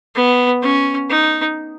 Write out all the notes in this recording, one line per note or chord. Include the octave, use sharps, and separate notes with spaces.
B3
C#4
D#4